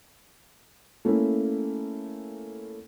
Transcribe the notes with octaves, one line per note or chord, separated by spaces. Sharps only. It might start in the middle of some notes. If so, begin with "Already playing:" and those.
A3 A#3 C#4 E4